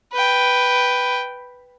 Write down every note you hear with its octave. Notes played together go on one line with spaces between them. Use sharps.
B4 G5